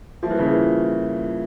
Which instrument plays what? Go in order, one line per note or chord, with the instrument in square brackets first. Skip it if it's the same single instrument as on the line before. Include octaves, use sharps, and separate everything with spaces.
[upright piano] F3 [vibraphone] G3 A#3 F4 A#4 E5
[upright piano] E3
C#3
E3